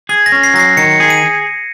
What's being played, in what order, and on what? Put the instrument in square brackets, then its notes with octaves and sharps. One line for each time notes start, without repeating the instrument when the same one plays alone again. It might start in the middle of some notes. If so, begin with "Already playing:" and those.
[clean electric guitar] G#4 [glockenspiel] G#6
[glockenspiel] A#6
[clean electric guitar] C#4
[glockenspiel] C7
[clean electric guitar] F#3 [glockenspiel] A#6
[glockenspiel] C7
[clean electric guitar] D#3 [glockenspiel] C#7
[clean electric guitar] G#4
[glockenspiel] D#7